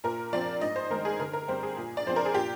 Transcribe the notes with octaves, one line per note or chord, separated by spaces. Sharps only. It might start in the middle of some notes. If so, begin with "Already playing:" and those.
A#2 A#4
F3 C4 D5
G#2 D#5
C5
D#3 G#3 A#4
G#4
D3 A#4
A#4
G3 C4 C5
G#4
A#2
D5
F3 C4 C5
A#4
G#4
A#2 G4